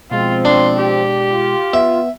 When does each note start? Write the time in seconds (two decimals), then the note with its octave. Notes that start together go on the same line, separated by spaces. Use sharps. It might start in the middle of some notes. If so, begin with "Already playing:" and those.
0.11 B2 F3 G#3 C4 F4
0.45 D4 C6
0.77 G4
1.31 F4
1.73 B3 E5